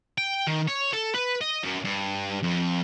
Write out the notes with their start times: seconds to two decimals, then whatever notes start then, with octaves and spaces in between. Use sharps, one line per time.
0.18 G5
0.47 D#3
0.68 C#5
0.93 A4
1.14 B4
1.41 D#5
1.64 F#2
1.84 G2
2.43 F2